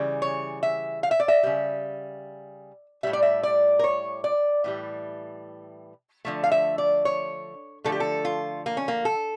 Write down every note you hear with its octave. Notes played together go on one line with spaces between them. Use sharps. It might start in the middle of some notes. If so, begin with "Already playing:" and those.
Already playing: C#3 E3 G3
C#5
E5
F5
E5
D5
E5
C#3 G3
A2 G3 E5
D5
E5
D5
A#4
C#5
D5
A2 E3 G3
D3 F3 A3
F5
E5
D5
C#5
D3 F3 A3 A4
G4
A4
F4
A#3
C#4
A#3
A4